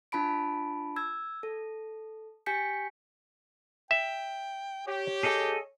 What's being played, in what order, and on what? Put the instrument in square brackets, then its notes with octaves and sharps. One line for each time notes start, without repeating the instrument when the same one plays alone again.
[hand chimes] D4 F4 A5 B5 D7
E6 G#6
A4
G4 G#5 G6 B6 C#7
[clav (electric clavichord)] E5 [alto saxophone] G5
[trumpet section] G4 [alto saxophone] C#5
[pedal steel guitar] G#4 A4 D#5